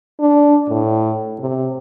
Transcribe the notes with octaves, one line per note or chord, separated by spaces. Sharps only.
D4
A2
C3